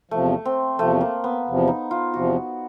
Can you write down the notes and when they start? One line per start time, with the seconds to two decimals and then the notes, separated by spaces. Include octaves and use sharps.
0.11 E2 C3 F3 A3
0.45 C4
0.79 E2 C3 F3 A3
1.01 A#3
1.24 B3
1.46 E2 C3 F3
1.68 D#4
1.91 F4
2.13 E2 C3 F3 F#4